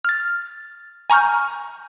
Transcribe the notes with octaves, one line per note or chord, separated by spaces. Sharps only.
F6 A6
G#5 A#5 C#6 F6 G6